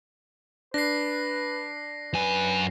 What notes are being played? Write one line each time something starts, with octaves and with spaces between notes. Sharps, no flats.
D4 B4 A#6 C7
F#2 B4 G#5